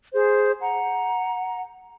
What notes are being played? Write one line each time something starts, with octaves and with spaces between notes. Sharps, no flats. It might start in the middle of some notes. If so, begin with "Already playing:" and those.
G#4 C5
F#5 A#5